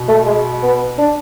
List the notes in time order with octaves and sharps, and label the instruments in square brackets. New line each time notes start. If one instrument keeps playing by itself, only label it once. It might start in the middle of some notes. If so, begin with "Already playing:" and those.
Already playing: [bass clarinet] B2
[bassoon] A3
G#3
B3
D4